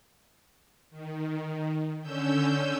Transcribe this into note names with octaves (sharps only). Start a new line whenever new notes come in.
D#3
D3 C#4 E6 G6